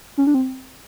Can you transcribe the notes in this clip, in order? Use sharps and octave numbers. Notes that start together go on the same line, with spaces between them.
C#4
D4
C4